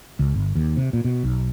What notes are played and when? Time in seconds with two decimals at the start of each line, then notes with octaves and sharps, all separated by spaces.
0.19 C#2
0.34 G1
0.55 D#2
0.77 C3
0.93 A#2
1.04 B2
1.24 B1